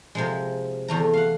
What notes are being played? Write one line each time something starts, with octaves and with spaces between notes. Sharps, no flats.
C3 F3 G#3
E2 A3 A#5
F5 F#5